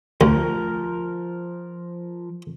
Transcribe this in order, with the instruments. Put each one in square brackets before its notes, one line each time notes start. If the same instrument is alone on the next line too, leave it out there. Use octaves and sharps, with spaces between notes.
[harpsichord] D2 [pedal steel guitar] F3 A#4